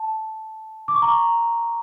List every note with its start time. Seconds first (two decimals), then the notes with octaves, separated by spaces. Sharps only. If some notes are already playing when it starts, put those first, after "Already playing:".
Already playing: A5
0.88 D6
0.95 C#6
1.02 A#5